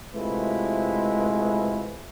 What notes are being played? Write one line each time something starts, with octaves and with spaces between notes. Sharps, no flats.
C3 G#3 A3 E4 F4 B4